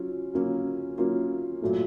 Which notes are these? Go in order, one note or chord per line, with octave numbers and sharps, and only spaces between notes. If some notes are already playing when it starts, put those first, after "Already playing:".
Already playing: F#3 C#4 F4
F#3 A#3 C#4 F4
F#3 A#3 C#4 F4
A#2 F#3 A3